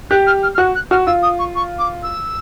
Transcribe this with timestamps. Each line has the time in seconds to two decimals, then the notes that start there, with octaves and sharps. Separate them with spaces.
0.10 G4 F#6
0.26 F6
0.43 F6
0.54 F6
0.58 F#4 F#6
0.75 F#6
0.91 F#4 F6
1.06 F4 E6
1.22 D#6
1.39 C#6
1.55 C#6
1.79 D6
2.03 E6